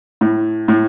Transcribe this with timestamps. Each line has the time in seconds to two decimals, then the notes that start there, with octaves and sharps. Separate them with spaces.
0.21 A2
0.68 A2